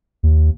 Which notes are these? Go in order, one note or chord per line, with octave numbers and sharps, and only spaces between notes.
D#2